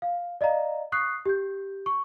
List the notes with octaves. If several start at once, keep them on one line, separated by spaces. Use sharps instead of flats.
F5
D5 D#5 F5 A#5
C#6 D#6 F#6 C7
G4 G6
C#6